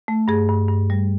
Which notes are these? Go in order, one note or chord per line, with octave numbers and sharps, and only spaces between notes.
A3
G2 G#4
G2
G2
G3